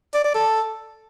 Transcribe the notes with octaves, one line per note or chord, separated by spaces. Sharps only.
D5
D5
A4